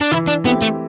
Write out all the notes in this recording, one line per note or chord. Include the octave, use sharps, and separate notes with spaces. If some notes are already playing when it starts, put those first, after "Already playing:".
D4
E3 E4
D4
A3 B3 C4 E4 G4
A3